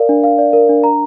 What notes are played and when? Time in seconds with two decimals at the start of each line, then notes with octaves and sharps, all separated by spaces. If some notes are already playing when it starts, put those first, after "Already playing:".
Already playing: A#4 D5 F5
0.09 D4
0.24 F5
0.38 D5
0.53 A#4
0.69 D4
0.84 A#5